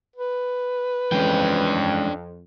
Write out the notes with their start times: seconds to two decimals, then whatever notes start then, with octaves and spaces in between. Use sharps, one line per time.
0.16 B4
1.12 F2 E3 G#3 C#4 D4 G5